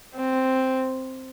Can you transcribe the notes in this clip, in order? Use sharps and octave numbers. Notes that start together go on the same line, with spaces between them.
C4